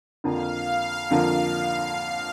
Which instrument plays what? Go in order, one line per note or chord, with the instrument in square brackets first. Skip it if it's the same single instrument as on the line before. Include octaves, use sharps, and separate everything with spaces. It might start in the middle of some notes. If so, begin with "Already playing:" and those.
[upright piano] F2 D3 F3 A#3 [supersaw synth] F5
[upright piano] F2 D3 F3 A#3